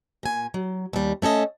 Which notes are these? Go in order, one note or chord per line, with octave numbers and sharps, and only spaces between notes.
A#2 G#5
F#3
D#2 G3
A3 C#4 A4 D#5